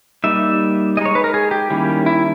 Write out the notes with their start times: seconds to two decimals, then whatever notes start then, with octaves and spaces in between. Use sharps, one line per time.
0.24 G3 A#3 D#4 E5
0.97 G#3 D#5
1.01 D#4 C#5
1.15 B4
1.24 A#4
1.34 G#4
1.51 G4
1.70 D#3 G3 A#3 C#4 E4
2.06 E4